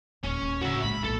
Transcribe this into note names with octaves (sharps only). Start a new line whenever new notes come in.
D#1 C#4
D#1
A2 C#3 F#4 E5
A#1 G#3 B5
B1 A#2 A4